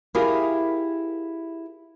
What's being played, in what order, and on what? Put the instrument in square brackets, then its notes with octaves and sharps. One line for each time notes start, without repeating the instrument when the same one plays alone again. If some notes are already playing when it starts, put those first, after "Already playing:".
[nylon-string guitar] E4 G4 G#4 A#4 F5